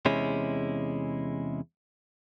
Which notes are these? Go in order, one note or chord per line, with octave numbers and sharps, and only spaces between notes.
E2 C3 G#3 C#4 E4